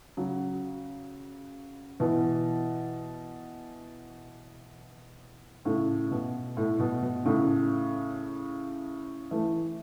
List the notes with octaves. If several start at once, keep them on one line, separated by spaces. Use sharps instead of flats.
C#3 F#3
B2 E3
A2 C#3
B2
A2
B2
B2
A2 C#3
E3 A3